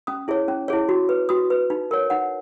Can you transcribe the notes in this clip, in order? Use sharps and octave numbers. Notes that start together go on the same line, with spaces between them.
C#4 D#6
E4 G#4 C#5
C#4
E4 G#4 C#5
F#4
B4
F#4 D#6
B4
D#4
A#4 C#5
D#4 F#5